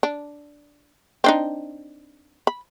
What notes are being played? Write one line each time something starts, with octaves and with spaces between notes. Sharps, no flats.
D4
C4 D4 D#4
B5